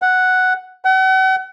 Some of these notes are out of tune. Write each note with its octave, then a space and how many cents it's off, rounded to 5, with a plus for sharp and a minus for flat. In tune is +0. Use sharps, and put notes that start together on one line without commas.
F#5 +0
F#5 +40